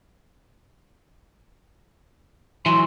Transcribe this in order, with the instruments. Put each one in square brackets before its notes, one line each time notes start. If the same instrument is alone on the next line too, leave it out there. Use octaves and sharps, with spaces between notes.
[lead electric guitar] E3 F#3 [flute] C6